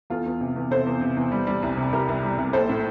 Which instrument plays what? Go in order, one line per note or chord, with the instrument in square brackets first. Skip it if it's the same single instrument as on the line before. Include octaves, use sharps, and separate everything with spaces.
[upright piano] E2 F4 A4
E2
C3
E2
C3 A4 C5
E2
C3
E2
G3
G3
C2
C3
C2 G4 A#4
C2
G3
C2
A#1 A4 C5
A2